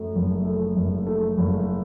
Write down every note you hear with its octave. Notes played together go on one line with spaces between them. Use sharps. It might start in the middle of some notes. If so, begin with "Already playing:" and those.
Already playing: F#2 A3
F#1
A3
F#1
A3
F#1